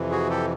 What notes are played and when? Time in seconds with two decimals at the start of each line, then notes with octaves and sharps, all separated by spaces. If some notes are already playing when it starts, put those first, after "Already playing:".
Already playing: F2 C3 E3
0.11 F#4 G#4
0.30 G4 A4